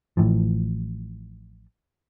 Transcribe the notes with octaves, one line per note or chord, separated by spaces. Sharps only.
A1 A2 E3 F3